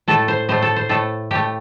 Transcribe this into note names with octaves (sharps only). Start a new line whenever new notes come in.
A2 A3 A4
C5
A2 A3 C5
A4
C5
A2 A3 A4
A2 A3 G4